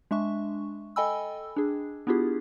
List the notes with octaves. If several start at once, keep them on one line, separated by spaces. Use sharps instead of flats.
G#3 D4 E5 C#6
A4 D#5 G5 G#5 B5 E6
D4 G#4
B3 D4 E4 F4 G4 G#4